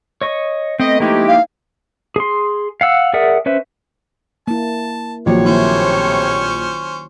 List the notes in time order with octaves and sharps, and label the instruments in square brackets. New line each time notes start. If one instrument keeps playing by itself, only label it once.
[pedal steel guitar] C#5 D#5 C#6
[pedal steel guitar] A3 B3 [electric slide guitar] C4 [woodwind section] D#5
[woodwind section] F3 G#3 G4 [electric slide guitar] A#3 D#4 E4
[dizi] F5
[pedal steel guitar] G#4 C6
F5 F#5 E6
G#4 A#4 D5 E5 F#5
C#4 B4 C5 E5
[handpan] A#3 E4 [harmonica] A5
[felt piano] A#1 [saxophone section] A2 C3 C#5 [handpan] D#3 F#3 F#4
[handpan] D#3 A#3 E4 [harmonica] C#4 C5 C#6